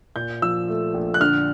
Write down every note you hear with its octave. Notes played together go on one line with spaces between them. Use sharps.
A#2 G6
F3 E6
A3
A#1
F#6
D3 F6